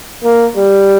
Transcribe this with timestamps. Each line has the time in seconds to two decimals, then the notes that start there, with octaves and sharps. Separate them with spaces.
0.24 A#3
0.57 G3